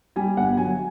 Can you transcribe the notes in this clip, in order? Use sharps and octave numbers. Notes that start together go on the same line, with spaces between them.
G3 G#5
G1 F#5
F#3 G#5